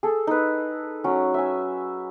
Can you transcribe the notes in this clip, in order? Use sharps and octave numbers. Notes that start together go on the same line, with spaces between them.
G#4 A4
D#4 B4
F#3 C#4
E5 G#5